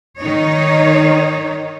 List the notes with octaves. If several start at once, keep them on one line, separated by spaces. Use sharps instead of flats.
D#3 D#4 C#5